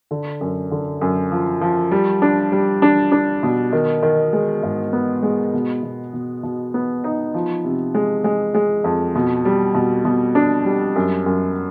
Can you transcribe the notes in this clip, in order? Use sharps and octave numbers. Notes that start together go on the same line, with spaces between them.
D3
F#2
D3
F#2
F3
F3
G3
D4
G3
D4
D4
B2
D#3
D#3
G#3
G#2
B3
G#3
B2
B2
B2
B2
B3
D#4
F3
C3
G#3
G#3
G#3
F2
B2
G3
B2
B2
D4
G3
F#2
F#2